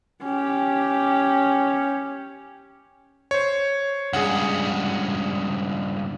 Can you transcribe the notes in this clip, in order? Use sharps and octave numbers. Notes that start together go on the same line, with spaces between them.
C#4 G4
C5 C#5
C#2 G2 G#4 F#5